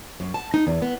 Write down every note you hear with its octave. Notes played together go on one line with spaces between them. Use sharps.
F#2
A5
D#4
E2
B3